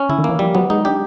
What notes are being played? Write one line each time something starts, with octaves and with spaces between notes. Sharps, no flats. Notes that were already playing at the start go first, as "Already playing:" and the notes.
Already playing: C#4
D3 E4
D#3
E3 A#3
F3 G3
F#3 B3
G#3 D#4
D4 G4